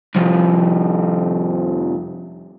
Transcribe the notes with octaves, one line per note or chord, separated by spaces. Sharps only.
C2 F2